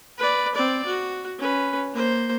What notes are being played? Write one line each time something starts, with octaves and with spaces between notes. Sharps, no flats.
B4 D5
C4 D5
F#4
C#4 B4
A#3 C5